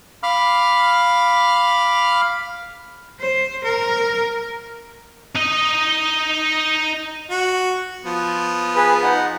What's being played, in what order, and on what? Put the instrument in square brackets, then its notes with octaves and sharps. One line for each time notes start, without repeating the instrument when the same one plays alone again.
[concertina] F5 B5 D6 F6
[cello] C5
A#4
[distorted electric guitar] D#4 D#5
[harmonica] F#4
F3 B3
[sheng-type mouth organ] G#4 B4
D#4 F#5